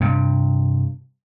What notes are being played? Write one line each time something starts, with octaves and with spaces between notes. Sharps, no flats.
G2 C3